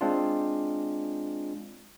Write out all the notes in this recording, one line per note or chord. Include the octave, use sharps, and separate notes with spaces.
G#3 C4 D4 F4